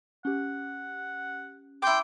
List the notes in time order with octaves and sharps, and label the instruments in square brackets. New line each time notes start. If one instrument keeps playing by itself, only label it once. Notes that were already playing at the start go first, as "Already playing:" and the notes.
[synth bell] C#4 G4 [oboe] F#5
[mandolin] E4 D6 [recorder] G5 [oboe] C6